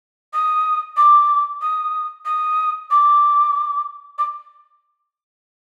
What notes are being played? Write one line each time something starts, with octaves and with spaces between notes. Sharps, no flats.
D#6
D6
D#6
D#6
D6
D6